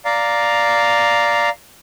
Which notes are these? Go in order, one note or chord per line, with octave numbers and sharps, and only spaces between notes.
D5 F5 A#5